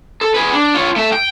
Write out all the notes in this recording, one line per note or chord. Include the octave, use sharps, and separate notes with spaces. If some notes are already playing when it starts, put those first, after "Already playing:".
A4
G#4 B4
D4
F4 C#5
A3 E5
G5